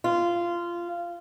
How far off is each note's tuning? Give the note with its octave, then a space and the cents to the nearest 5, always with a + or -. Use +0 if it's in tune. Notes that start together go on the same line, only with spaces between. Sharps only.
F4 -15